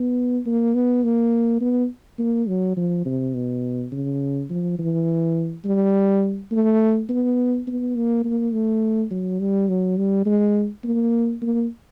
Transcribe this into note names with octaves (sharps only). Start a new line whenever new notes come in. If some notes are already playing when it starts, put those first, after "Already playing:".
Already playing: B3
A#3
B3
A#3
B3
A#3
F#3
F3
C3
B2
C#3
F3
E3
G3
A3
B3
B3
A#3
A#3
A3
F#3
G3
F#3
G3
G#3
A#3
A#3